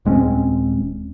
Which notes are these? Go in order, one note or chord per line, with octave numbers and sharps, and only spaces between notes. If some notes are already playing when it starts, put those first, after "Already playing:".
D#1 G#3 C4 C#4